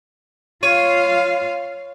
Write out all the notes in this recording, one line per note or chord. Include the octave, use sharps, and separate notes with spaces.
F4 C#5 F5 D#7